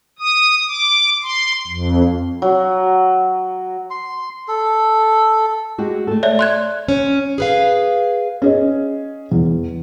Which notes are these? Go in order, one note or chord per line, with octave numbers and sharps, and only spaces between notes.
D#6
D6
C6
F2
F#3
C6
A4
G#3 F#4 G4
A3 A4
C#5 D5 E5
C6 F#6 G#6
C#4
G#4 B4 F5
C#4 G#4 D#5
E2